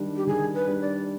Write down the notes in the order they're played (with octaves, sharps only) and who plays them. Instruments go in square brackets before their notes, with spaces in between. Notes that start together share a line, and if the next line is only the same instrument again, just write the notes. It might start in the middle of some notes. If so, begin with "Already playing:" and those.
Already playing: [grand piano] D#3 G3 D4
[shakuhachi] G4
[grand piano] D#3 [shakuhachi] G#4
[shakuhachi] B4
[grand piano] G3 D4
[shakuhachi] D5